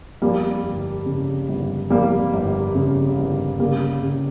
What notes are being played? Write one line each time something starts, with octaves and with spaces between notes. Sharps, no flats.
F2 G3 A#3
G1
C#3
G1
F2 G3 A#3
G1
C#3
G1
C#3 G3 A#3
C#3